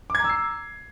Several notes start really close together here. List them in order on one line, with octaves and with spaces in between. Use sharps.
D6 G#6 A#5 E6 C7